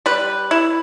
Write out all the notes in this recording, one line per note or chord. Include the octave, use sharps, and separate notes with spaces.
G3 B4
E4